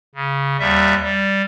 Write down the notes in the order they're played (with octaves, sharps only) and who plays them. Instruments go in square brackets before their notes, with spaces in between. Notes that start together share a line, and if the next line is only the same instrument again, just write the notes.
[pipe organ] C#3
D#2 G3 E5
G3